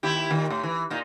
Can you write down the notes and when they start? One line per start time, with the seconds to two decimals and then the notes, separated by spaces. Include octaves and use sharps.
0.03 D#2 E4 G4
0.30 A#2 D#3
0.50 A2
0.63 E3
0.90 A#2 D#4